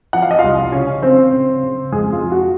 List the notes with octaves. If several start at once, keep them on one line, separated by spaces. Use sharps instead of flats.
F3 F#5
F5
D#5
C2 F4 F5
C#3 C#4 C#5
C#3 C4 C5
C#3
C#3
F2 G#3 G#4
F4
F3
F#4